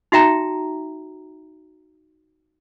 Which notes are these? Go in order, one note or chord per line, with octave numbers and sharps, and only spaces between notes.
D#4 F#4 E5 G5 A#5